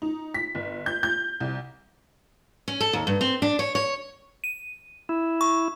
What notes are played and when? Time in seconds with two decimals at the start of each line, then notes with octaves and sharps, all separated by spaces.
0.02 D#4
0.34 B6
0.55 G1
0.86 G6
1.03 G6
1.40 C2
2.68 C#4
2.81 A4
2.93 D#2
3.07 G2
3.21 C4
3.42 D4
3.59 C#5
3.75 C#5
4.44 D#7
5.09 E4
5.41 C#6